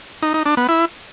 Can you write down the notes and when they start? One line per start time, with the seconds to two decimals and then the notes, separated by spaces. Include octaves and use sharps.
0.23 D#4
0.34 D#4
0.46 D4
0.57 B3
0.69 E4